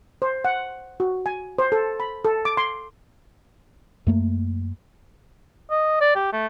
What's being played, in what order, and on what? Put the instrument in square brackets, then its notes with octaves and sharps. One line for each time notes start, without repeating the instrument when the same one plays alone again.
[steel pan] C5
F#5
F#4
G#5
C5
A4
B5
A4
D6
C6
[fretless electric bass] F#2 A3 A#3
[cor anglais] D#5
D5
G4
A3